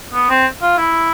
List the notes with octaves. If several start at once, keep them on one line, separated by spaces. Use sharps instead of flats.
B3
C4
F4
E4